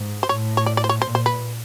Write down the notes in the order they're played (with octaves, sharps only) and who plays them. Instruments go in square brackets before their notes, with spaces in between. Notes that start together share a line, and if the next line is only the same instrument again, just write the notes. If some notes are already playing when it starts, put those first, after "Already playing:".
Already playing: [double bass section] G#2
[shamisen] C5
[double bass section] A2 [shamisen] C#5
[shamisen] C#5
D5
D5
C5
C#5
[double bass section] A#2 [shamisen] C5
[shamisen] C5
B4